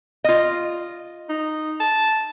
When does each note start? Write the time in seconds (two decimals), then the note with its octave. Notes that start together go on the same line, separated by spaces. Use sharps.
0.24 F4 D#5
1.30 D#4
1.80 A5